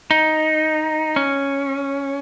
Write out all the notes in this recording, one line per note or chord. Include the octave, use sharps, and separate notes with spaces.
D#4
C#4